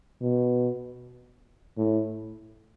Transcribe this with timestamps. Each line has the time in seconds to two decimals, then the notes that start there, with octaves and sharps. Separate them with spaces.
0.22 B2
1.77 A2